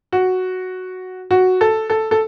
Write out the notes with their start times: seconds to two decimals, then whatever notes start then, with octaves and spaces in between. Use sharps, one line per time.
0.13 F#4
1.31 F#4
1.61 A4
1.90 A4
2.11 A4